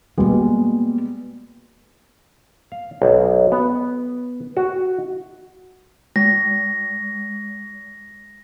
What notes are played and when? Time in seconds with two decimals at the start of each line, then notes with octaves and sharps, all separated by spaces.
0.18 B2 G3 G#3 A#3 B3
2.72 F5
3.02 B1
3.52 B3
4.57 F#4
6.16 G#3 A#6